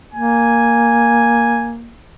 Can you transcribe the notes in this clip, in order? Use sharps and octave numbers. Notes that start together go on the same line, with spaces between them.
A#3 G#5